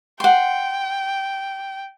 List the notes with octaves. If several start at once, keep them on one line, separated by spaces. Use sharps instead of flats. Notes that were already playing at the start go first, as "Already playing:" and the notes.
F#5 G5 C6